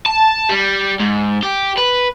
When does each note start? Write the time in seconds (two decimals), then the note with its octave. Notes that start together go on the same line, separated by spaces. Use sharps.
0.06 A5
0.49 G3
1.00 G#2
1.43 G4
1.78 B4